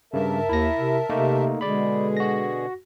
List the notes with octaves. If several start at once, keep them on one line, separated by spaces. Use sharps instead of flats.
G2 C#3 A#4 E5 A5
D#2 E4 A#6
C3
C3 A3 A#3 D#4
B2 D3 G#3 G#4 D5 B5
F#4 A#6